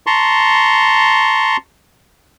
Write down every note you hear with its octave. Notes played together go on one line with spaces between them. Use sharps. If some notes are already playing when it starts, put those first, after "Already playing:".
A5 A#5 C6 C#6